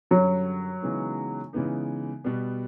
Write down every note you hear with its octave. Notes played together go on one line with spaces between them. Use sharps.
F#2 D3 F#3 G3
C#3 E3 G#3 B3 D#4
C#3 E3 G#3 B3 D#4
B2 G3 B3